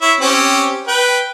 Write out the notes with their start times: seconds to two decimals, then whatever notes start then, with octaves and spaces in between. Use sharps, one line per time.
0.01 E4 C#5 E5
0.20 C4 C#4 G4
0.88 B4 G5